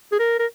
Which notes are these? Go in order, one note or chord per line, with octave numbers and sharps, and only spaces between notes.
G#4
A#4
A#4